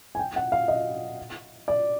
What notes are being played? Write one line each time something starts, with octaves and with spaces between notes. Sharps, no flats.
G#5
G5
F#5
F5
D#5
D5